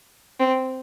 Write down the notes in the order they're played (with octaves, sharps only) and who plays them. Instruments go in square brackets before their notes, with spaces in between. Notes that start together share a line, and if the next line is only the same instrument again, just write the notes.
[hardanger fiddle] C4